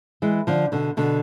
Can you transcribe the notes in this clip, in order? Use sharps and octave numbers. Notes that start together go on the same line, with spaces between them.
E3 G#3
D3 F3
B2 D3
B2 D3